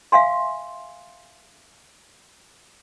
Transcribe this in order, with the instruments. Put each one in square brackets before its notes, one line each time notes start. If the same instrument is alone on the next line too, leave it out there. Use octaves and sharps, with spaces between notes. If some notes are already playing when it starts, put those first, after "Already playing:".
[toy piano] E5 F5 G#5 C6